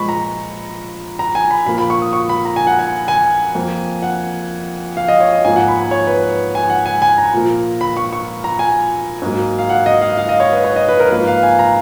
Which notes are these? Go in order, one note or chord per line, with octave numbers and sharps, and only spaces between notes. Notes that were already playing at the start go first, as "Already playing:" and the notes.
Already playing: A#2 F3 G#3 B5 C#6
A#5
A#5
G#5
B5
A#2 F3 A#3 B5
B5
C#6
D#6
C#6
B5
A#5
G#5
F#5
G#5
G#5
F2 F3 A#3
F#5
F5
D#5
C#5
D#5
G#2 F3 A#3 G#5
F#5
B5
G#5
C#5
B4
B4
G#5
F#5
G#5
G#5
A#5
A#2 F3 A#3
B5
C#6
C#6
A#5
G#5
G#2 F#3 A#3
F5
F#5
D#5
F5
F5
D#5
C#5
B4
C#5
D#5
B4
A#4
G#2 F3 A#3 B4
F5
G#5
A#5